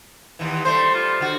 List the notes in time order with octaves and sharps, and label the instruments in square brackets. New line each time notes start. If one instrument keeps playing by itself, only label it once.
[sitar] D#2 E3
[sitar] G3 A3 C5 [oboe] C6
[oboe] F4
[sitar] D3 F#4